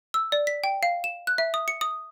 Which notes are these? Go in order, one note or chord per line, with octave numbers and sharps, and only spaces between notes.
E6
D5
B6
G5
F5
E7
F#6
E5
D#6
C#7
D#6